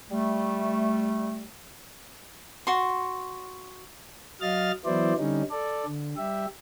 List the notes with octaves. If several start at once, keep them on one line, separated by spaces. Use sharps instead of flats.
G3 A3
F#4 C6
F#3 D#5 F5 F6 A6
E3 F#3 B3 E4 C5 D5
D3 G3 C#4 D#4
A4 D5
D3
G3 G4 E5